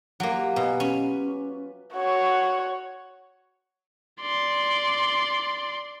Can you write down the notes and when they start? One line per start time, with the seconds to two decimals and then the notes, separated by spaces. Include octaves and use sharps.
0.20 F#3 A#3 E4 F4 G4
0.56 B2 G4 G#5
0.80 C#4 B4
1.94 F#4 C#5
4.22 D5 C6